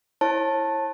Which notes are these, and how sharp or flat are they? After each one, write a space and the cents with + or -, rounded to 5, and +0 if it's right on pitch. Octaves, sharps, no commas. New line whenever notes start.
E4 +0 C#5 -40 A5 +0